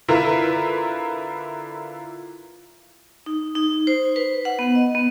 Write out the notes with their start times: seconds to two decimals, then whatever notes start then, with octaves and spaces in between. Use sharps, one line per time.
0.08 D3 E4 F4 A#4 B4
3.26 D#4
3.55 D#4
3.87 C5
4.16 B4
4.45 F#5
4.59 B3
4.75 D#5
4.95 B3